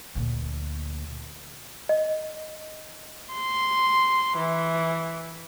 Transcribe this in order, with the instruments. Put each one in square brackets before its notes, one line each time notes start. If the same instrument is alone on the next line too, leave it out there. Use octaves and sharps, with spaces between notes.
[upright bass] D2 A#2
[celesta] D#5
[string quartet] C6
E3